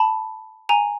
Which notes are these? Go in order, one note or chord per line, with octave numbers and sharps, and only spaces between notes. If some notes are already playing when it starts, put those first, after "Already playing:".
Already playing: A5 B5
G#5 A#5